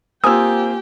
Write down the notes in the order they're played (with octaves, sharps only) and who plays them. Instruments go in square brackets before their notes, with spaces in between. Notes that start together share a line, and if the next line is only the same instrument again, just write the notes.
[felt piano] A#3 C4 F4 [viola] G4 G5 [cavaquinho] G#5 [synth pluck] D#6 E6